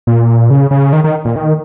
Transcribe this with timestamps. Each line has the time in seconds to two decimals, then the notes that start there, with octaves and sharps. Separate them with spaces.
0.07 A#2
0.50 C#3
0.71 C#3
0.93 D#3
1.04 D#3
1.25 A#2
1.36 D#3